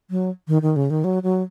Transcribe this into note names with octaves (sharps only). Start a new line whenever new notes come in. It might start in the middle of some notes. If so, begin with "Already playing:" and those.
F#3
D#3
D#3
C#3
D#3
F#3
F#3